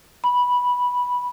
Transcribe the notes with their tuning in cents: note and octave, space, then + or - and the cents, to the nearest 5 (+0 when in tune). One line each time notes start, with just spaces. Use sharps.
B5 -10